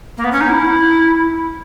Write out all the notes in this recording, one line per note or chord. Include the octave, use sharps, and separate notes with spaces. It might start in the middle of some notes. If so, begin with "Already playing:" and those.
A#3
B3
C#4
D#4
E4